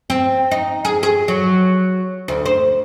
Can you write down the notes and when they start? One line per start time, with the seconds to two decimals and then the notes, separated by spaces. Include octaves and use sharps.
0.10 C4
0.51 D#4
0.85 G#4
1.03 G#4
1.28 F#3
2.28 D2
2.46 C5